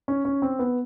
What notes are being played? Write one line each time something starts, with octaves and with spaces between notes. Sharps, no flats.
C#4
C#4
C4
B3